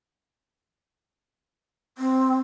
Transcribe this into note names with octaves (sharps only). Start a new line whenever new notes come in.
C4